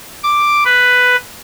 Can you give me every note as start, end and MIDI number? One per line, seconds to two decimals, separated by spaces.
0.23 0.64 86
0.65 1.16 71